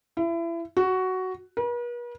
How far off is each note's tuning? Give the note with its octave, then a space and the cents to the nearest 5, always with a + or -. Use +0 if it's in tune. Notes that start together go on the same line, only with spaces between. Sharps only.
E4 +30
F#4 +10
B4 -45